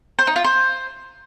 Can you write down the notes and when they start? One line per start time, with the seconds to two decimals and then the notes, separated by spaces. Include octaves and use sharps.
0.19 C5
0.27 D#4
0.36 F4
0.44 C5